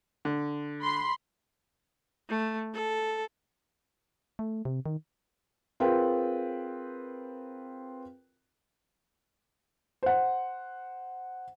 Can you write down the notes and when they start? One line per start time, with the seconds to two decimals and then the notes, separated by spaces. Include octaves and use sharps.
0.25 D3
0.81 B5 C6
2.29 A3
2.74 A4
4.39 A3
4.65 C3
4.86 D#3
5.80 C4 F4 G#4 A#4 B4 G5
10.03 C5 F#5